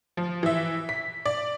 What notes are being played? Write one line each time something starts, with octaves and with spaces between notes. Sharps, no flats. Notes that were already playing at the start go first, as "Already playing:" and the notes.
F3
E3 E5
B6
D5